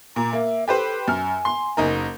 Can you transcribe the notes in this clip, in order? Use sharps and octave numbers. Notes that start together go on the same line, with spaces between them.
A#2 A#5
A#3 E5
G4 A4 B4 C5
F#2 G#5 F6
C6
F#1 D#4 A#4